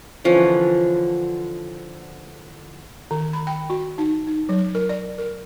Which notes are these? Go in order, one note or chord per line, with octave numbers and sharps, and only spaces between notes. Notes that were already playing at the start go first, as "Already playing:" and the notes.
D3 E3 F3 C#4
D#3
B5
G5
F#4
D#4
D#4
F#3
A#4
D5
A#4